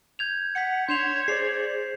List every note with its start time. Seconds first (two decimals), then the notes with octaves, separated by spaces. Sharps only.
0.19 G6 G#6 F7
0.55 F#5 B6 C#7
0.89 D4 C#5 C6 G6 E7 F7
1.28 G#4 C5 D5 C7